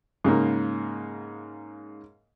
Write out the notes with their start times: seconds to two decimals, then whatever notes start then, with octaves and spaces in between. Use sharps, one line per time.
0.24 G#2 C#3 A#3